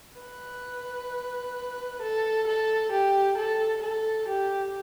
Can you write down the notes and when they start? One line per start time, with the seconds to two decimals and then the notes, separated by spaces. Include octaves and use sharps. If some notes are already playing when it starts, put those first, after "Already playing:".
0.21 B4
2.02 A4
2.47 A4
2.92 G4
3.38 A4
3.83 A4
4.28 G4